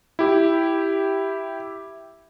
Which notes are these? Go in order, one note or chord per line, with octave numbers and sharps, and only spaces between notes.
E4 G4